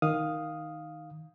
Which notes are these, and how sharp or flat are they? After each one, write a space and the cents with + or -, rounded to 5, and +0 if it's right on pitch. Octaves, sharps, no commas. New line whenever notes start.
D#3 +0 F5 +5 D#6 +0